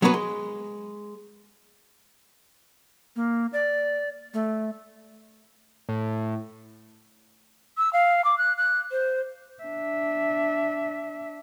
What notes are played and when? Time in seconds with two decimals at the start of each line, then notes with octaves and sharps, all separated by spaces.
0.02 F#3 B3 C#4 F#4 B4
0.14 G#3
3.16 A#3
3.53 D5
4.34 A3
5.89 A2
7.77 E6
7.93 F5
8.24 D6
8.38 F#6
8.57 F#6
8.91 C5
9.63 D4 E5